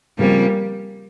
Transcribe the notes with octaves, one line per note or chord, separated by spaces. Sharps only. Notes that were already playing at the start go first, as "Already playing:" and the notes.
C#3 F3 G3 A#3 C4